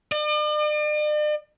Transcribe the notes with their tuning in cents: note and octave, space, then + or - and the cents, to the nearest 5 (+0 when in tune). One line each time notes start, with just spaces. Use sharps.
D5 +45